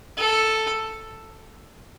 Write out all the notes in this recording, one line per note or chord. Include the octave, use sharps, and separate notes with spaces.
A4